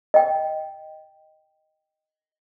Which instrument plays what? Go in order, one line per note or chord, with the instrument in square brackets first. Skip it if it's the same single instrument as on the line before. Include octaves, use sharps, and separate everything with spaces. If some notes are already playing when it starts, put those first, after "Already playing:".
[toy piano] D#5 G5